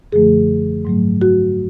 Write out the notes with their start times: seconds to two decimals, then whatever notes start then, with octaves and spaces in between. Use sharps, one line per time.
0.12 F#2 D3 F3 A3 G#4
0.85 G#2 F#3 A3
1.21 F#4